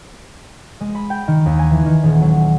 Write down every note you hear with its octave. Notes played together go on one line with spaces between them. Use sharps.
G#3
B5
G5
D#3
D#2
G#5
E3
D#3
D#1
F#3